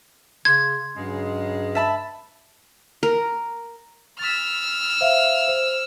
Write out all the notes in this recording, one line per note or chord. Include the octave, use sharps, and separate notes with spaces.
C#3 C6 G#6
G2 C#3 F#3 G#3
E5 A5 B5
A#4
E6 F6 A6 B6
C5 E5 F5
C5